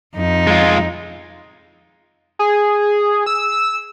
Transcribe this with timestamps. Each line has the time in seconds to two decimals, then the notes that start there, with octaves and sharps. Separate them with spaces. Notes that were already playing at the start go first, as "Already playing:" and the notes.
0.16 F2 D#4
0.47 G#3 F4
2.39 G#4
3.26 E6